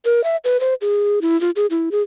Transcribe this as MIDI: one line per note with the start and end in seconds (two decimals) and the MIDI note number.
0.05 0.24 70
0.24 0.37 76
0.45 0.58 71
0.60 0.74 72
0.81 1.19 68
1.22 1.39 64
1.41 1.50 65
1.56 1.66 68
1.70 1.89 64
1.92 2.02 68